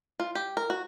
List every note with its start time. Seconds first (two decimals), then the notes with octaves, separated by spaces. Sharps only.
0.19 F4
0.35 G4
0.57 A#4
0.70 F#4